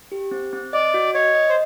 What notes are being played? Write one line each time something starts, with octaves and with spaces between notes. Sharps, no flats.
G4
C4
C4
D5 D#5
F#4
C#5 D#5
D#5
C5